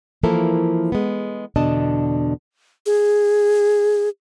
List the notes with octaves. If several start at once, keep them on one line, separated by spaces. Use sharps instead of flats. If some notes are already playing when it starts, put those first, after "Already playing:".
E3 F3 A#3 E4 A4 A#4
G#3 B3
E2 B2 D3 D4 D#5 A5
G#4